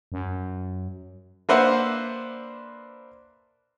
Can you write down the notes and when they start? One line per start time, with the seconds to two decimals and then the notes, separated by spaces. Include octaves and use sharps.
0.12 F#2
1.49 A#3 D4 B4 C5 E5 F#5